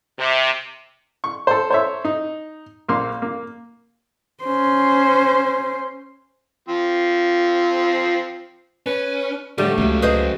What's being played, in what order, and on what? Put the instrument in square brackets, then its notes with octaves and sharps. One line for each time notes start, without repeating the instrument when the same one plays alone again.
[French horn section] C3
[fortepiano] C#6
A4 C5
C5 C#5 E5
D#4
A#1 A#3 C6
A#3
[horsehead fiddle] C#4 C5
[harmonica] F3 C4
[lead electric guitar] C#4 [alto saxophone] B4
[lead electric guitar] A2 D3 [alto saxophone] G3 [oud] A3
[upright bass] C#2 A#3 [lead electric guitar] C#3 F#3
[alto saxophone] G#4 [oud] B4 C5 D#5